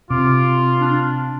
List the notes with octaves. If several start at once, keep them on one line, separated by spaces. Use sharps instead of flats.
C3 F4 D6
D4